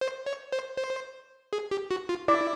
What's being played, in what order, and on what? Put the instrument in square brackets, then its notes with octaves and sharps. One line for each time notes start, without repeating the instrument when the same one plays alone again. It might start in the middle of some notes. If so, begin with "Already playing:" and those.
[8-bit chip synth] C5
C#5
C5
C5
G#4
G4
F#4
F4
[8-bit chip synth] E4 [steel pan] D5